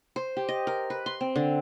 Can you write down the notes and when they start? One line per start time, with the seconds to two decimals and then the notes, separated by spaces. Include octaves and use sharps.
0.16 C5
0.37 G4
0.49 D#5
0.67 A#4
0.90 B4
1.06 C6
1.21 C4
1.36 D3